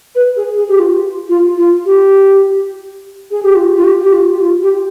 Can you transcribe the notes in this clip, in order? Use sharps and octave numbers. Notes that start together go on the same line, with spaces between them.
B4
G#4
G#4
G4
F4
F4
F4
G4
G#4
G4
F4
F4
G4
G4
F4
G4
F4
G4